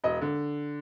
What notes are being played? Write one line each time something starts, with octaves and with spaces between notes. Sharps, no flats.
E1 D#5
D3